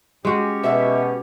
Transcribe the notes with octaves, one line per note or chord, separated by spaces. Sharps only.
G#3 C#4 F#4 G4
B2 E5